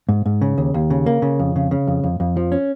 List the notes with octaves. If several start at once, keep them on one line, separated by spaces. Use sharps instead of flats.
G#2
G#2
C#3
D#2
D#2
C#3
A#3
C#3
F2
C#3
C#3
F2
F2
F2
F3
C#4